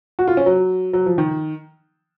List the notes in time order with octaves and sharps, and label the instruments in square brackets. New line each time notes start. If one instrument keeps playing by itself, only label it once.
[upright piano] F#4
F4
C#4
F#3
F#3
F3
D#3